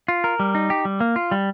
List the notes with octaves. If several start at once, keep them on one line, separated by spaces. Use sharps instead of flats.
F4
A#4
G3
D#4
G4
G3
A#3
F4
G3